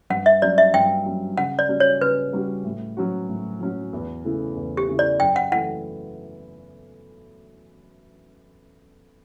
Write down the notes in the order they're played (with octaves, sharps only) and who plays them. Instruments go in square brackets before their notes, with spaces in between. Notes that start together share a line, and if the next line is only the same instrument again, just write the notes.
[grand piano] G2 [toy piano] F#5
[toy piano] E5
[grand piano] F#3 C#4 [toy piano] D5
[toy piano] E5
[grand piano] G2 [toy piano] G5
[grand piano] F#3 C#4
[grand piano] C#3 [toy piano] F#5
[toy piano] D5
[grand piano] G3 C#4 F#4
[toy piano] C#5
[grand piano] C#3 [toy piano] B4
[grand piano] G3 C#4 F#4
A2
F#3 C#4 F#4
A2
F#3 C#4 F#4
E2
C#3 E3 A3 E4
E2
[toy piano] G4
[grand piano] C#3 E3 A3 E4
[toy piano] D5
[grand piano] F#2 [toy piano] G5
[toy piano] F#5
[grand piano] E3 A3 [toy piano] F#5